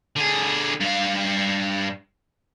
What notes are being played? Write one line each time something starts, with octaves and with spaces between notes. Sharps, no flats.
D3 G#4
G2 F5